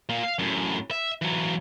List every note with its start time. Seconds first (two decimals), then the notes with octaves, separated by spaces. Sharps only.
0.09 A#2 A#3
0.23 F5
0.39 F#2 A2
0.91 E5
1.22 E3 F#3